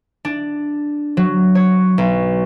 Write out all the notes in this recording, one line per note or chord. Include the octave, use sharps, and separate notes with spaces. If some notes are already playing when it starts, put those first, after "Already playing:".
D4
F#3
C#5
B1